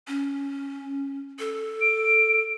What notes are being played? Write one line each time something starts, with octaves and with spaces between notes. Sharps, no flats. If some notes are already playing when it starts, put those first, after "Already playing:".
C#4
A4
D7